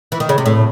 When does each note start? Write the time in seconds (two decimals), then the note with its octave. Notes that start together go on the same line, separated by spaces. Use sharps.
0.12 E3
0.20 D#3
0.29 C#3
0.38 C3
0.46 A2